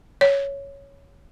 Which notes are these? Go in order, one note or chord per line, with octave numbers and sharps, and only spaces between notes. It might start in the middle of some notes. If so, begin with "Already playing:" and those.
C#5